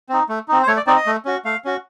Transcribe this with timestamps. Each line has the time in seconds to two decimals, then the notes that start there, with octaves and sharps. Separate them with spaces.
0.09 C4 D#4
0.29 A3
0.48 C4 D#4
0.63 C5
0.67 A3 C#5
0.77 D5
0.87 C4 D#4 D5
0.97 D#5
1.06 A3
1.25 C#4 F#4
1.45 A3 F5
1.65 C#4 F#4